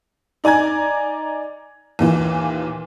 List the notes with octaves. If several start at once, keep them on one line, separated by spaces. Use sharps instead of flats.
D#4 D5 G#5 A#5 G#6
D#2 A#2 E3